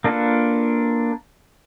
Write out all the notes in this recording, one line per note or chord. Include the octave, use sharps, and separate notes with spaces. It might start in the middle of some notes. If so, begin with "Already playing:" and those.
A#3 D4 F4 A4 B4